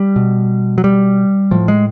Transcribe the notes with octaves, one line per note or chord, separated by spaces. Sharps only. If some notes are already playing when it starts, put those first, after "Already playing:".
Already playing: G3
B2
F#3
G3
A2 F3
G#3